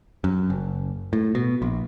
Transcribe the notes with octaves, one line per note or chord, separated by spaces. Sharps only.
F#2
F#1
A2
B2
A#1